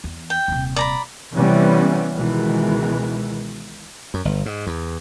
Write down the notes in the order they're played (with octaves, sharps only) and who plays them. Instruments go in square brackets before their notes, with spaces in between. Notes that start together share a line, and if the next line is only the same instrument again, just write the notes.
[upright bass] E2
[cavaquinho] G5
[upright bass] D#1 C3
[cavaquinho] D5 A#5 B5
[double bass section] C3 E3 G3 B3 C#4
C#2 B2 D#3 E3 G#3
[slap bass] F#2
G1
G#2
E2